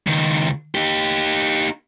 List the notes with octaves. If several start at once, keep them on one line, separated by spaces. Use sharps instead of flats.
C#2 D#3
D#4 G4